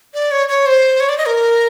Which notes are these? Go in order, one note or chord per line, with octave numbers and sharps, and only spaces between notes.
D5
C#5
C#5
C5
C#5
D5
D#5
A#4